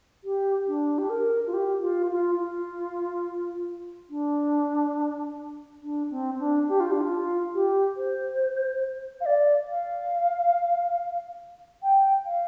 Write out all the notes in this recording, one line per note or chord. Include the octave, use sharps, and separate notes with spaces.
G4
D4
G4
A#4
F4
G4
F4
F4
F4
D4
D4
C4
D4
G4
F4
D4
F4
G4
C5
F5
D5
F5
G5
F5